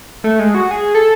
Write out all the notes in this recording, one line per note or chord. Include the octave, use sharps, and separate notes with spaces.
A3
G#3
F#4
G#4
A4